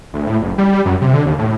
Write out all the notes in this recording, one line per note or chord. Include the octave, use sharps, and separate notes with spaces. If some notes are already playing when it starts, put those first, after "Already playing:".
D2
A2
F#1
G3
G3
F#2
C3
D3
D#2
A2